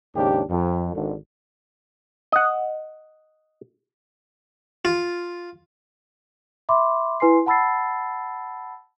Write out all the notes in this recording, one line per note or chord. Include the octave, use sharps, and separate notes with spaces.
D#2 G#2 C#3 D4 G4
F2
G#1 D3
D#5 F#5
F4
E5 B5 C6 D6
E4 B4 G#5 C6 C7
F#5 A5 B5 E6 A6 C7